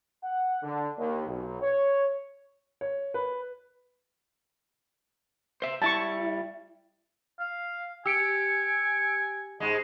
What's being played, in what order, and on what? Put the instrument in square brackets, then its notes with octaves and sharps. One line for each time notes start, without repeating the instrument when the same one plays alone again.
[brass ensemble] F#5
D3
D#2
B1
C#5
[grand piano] C#5
B4
[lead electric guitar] C5 E5
[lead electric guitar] G3 E4 [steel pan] A5 C#6
[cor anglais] F5
[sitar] G4 [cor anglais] G#5 [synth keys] E6 C#7 D7
[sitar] G#2 G#3